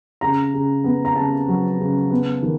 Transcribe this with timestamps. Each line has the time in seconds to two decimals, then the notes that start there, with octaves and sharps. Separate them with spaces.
0.21 C#3 A#5
0.54 C#3
0.84 B3
1.05 A#5
1.16 C#3 A5
1.48 F#3
1.80 C#3
2.11 B3
2.42 D#3